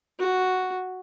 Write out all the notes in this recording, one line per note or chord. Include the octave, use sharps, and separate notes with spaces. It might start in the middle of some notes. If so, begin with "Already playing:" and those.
F#4